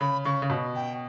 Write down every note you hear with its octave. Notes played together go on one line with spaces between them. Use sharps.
C#3 B5
C#3 C#6
C#3
B2
G5